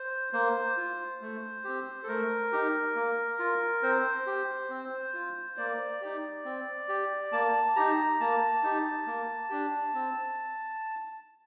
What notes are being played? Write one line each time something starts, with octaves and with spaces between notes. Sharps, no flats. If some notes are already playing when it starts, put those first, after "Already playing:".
Already playing: C5
A#3 C5
F4
A3
C4 G4
A4
A3 A#4
D#4 G4
A#3
F4
C4 C5
G4
C4
F4
A#3 D5
D#4 G4
C4
G4
A#3 A5
D#4 G4 A#5
A#3 A5
D#4 G4
A#3
D4 G4
C4